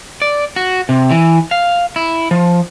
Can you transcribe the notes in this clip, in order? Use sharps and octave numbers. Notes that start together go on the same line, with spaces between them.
D5
F#4
C3
E3
F5
E4
F3